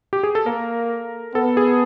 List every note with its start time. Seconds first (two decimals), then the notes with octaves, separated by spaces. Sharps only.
0.13 G4
0.23 G#4
0.35 A4
0.46 A#3 A#4
1.34 B3 A4
1.57 G#4